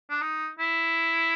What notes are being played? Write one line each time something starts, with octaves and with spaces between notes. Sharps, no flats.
D4
D#4
E4